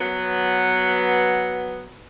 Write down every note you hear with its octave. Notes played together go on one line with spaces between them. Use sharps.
F#3 B3